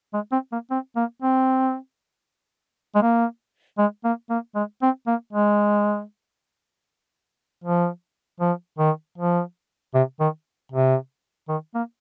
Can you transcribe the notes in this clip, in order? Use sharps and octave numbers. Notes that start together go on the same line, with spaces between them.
G#3
C4
A#3
C4
A#3
C4
G#3
A#3
G#3
A#3
A#3
G#3
C4
A#3
G#3
F3
F3
D#3
F3
C3
D#3
C3
D#3
A#3